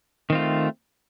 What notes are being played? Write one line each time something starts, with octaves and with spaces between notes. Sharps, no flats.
D#3 A3 C4 F4